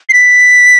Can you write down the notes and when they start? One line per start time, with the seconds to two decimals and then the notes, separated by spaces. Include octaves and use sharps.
0.09 C7
0.13 B6